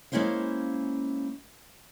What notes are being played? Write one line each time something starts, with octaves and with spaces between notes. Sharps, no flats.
G#3 A#3 C#4 E4 C5 F5